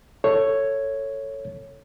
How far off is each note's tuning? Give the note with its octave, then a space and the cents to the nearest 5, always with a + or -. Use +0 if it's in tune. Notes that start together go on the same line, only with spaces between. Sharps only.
A4 +15 C#5 +0